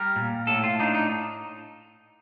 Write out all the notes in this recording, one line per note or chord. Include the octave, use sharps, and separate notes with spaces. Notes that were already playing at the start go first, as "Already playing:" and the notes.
Already playing: G3 A#4
A#2
A2 A4
F4
D4 D#4
D#4